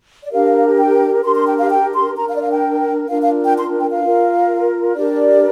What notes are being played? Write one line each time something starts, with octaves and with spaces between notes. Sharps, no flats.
D5
D4 G4 A#4 F5
G5
D4 G4 A#4 C6
C6
G5
F5
G5
C6
D4 A#4 A#5
F5
D5
F5
G5
D4 F4 A#4 F5
F5
G5
C6
G5
F5
F4 A#4
D4 G4 A#4 D5